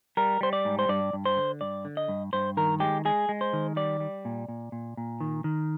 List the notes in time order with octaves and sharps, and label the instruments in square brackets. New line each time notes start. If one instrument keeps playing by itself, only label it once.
[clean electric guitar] G3 A#4
G3 C5
D5
G#2
C5
G2 D5
G2
C5
D3
G2 D5
D3
D#5
G2
G2 C5
D#3 A#4
G#3 G4
G#3 G#4
G#3
C5
D#3
G3 D5
G3
A#2
A#2
A#2
A#2
D#3
D#3